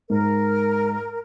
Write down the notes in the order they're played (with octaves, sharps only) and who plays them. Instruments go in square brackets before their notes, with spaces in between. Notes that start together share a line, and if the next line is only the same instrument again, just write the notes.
[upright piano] G#2 [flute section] A#4